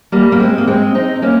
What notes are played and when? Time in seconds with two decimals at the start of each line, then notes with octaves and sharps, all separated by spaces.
0.12 G3 A#3
0.32 A#3
0.39 G#3 C4
0.58 A#3
0.67 G#3 C4
0.95 C4 D#4
1.16 D#4
1.22 A#3 C#4